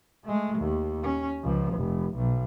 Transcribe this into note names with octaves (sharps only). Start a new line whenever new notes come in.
G#3 A3
D#2
C#4
C#2 F3
F1
B1